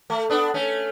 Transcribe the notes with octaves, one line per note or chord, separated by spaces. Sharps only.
A3
B3 D4 A4
A3 C#4